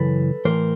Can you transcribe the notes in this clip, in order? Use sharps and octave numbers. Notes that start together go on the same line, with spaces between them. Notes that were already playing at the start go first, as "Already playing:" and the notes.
Already playing: F#2 C#3 E3 A4 B4
A2 E3 A#4 C5